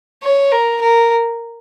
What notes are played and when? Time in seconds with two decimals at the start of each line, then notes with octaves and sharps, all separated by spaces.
0.23 C#5
0.52 A#4
0.81 A#4